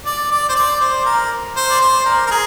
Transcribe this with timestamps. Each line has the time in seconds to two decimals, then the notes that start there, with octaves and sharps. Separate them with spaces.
0.06 D5
0.31 D5
0.49 C5
0.55 D5
0.80 C5
1.05 A#4
1.56 C5
1.70 D5
1.81 C5
2.05 A#4
2.27 A#4
2.31 G#4